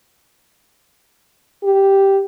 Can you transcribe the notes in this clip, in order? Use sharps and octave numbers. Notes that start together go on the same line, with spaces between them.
G4